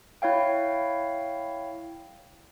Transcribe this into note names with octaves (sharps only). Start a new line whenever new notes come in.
E4 C#5 F5 G5